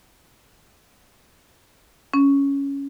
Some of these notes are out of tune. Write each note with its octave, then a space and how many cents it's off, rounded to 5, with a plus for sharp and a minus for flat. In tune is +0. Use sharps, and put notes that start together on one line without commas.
C#4 +5